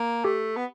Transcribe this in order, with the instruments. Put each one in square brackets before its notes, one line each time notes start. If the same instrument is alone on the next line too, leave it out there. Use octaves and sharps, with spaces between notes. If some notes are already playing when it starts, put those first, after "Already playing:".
Already playing: [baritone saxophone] A#3
[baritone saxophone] A3 [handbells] G4
[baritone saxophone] B3